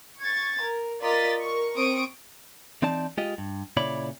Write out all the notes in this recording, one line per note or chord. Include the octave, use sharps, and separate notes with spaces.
C#6 G#6 A6
A#4
F4 A#4 D5 D#5 A6 B6
A#4 C#6
C4 C#6 D#6 D7
E3 C4 D#4 D5 A5
G#3 F4 G4 D#5
G2
A#2 C#3 E4 C#5 D5 B5